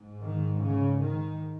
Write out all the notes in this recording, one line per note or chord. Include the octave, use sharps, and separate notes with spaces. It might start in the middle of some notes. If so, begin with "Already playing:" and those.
Already playing: G#2
D#3
C#3
D#3